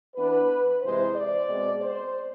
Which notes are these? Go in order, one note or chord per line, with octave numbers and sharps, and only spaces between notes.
E3 B3 D4 B4
C3 E3 G#3 C5
D5
B2 G#3 C4
C5